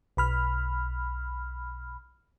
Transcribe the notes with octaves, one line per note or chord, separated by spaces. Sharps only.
B1 B5 F6